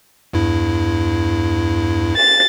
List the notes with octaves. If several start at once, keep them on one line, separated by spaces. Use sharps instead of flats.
E2 G2 E4
A6